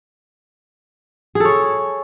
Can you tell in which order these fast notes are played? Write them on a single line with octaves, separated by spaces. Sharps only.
G#4 A4 C#5